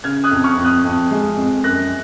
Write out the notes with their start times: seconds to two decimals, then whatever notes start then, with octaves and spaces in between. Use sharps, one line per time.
0.04 C#3 F6 G#6
0.24 D#6 F#6
0.31 F2
0.44 C#6 F6
0.58 F2
0.64 D#6 F#6
0.85 F2
1.11 G#3
1.37 F2
1.64 F#2 F#6 A#6